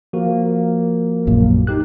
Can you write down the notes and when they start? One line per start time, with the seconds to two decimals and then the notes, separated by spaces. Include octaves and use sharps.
0.13 F3 A#3 F#4
0.46 A#3
1.27 A#1 F#2 A#2
1.67 D#4 G4 F#6